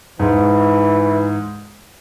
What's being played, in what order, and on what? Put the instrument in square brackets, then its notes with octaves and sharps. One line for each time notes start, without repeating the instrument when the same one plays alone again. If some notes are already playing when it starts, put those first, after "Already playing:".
[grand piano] G#2 [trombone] E3